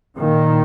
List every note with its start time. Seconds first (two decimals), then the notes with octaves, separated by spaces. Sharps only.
0.18 A#2 D#3